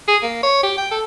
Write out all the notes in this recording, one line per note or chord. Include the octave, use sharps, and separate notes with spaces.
G#4
A#3
C#5
G4
G5
A4